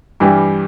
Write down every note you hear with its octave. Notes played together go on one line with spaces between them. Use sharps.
G2 E3 G3 G4